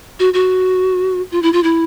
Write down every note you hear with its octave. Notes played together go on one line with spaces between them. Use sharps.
F#4
F#4
F4
E4
F4
E4